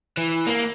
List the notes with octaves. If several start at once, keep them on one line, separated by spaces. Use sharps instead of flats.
E3
A#3